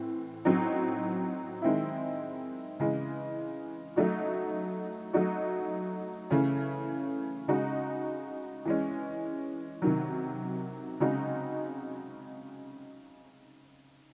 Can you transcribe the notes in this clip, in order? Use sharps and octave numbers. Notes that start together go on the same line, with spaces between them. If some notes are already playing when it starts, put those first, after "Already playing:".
Already playing: A2 E3 C4
A2 F#3 C4 D#4
D#3 G#3 C4 E4
C#3 E3 G#3
F#3 A3 D#4 F#4
F#3 A3 D#4 F#4
C#3 E3 A3 C#4
C#3 G#3 D#4 F#4
E3 G#3 C#4
C3 D#3 F#3
C#3 G#3 C4 D#4 F#4